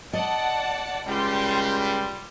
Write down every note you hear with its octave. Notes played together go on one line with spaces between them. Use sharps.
D5 D#5 F#5 A5
C#2 G3 G5 C6 G6